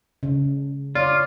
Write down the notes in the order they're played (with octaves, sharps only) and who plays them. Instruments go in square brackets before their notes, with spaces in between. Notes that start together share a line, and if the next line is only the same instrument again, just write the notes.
[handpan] C#3
[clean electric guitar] F4 [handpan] C#5 D5